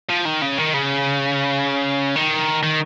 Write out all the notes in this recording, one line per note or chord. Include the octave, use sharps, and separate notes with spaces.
F3
D#3
C#3
D#3
C#3
D#3
D#3